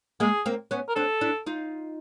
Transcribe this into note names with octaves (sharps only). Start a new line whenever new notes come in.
G#3 A#3 G#4
A#3 C4
B3 C#4
A#4
C4 D4 A4
D4 E4
D#4 F4